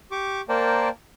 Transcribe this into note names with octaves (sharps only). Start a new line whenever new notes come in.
G4 C#6 D6
A#3 A#4 C5 D5 G5 A5